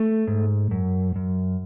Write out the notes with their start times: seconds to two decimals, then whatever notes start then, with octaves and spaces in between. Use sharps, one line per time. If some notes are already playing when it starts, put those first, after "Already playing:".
Already playing: A3
0.27 G#2
0.71 F#2
1.16 F#2